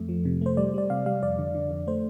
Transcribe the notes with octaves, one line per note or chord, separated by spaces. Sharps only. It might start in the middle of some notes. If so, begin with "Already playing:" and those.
Already playing: F2 A3
F3
C3
A3 C5
G3 D5
G3 D5
C3 F5
G3 F5
F2 D5
D3
D3
F2
A3 C5